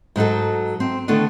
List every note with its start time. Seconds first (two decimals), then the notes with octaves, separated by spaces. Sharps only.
0.16 G#2 F#3 D#4 A4
0.80 C4
1.08 D3 D#3 A3 B3 D4